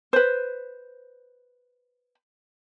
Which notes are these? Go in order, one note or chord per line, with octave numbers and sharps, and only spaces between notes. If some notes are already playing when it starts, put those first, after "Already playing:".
B4 C5